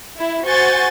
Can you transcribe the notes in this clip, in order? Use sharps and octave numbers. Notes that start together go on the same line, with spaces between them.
E4
F#4 C5 G#5 C#6 G6 A6